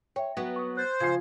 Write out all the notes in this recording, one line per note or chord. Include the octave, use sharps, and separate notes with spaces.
C#5 E5 G5
F#3 B3 F#4
C#6 D#6
C5 F#6 A6
C#3 F3 F4 G#6 C7